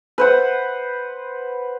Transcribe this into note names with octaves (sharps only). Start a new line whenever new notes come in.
B4 C5 F#5